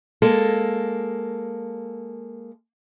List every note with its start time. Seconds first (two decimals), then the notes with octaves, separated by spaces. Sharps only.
0.22 G#3 A#3 A4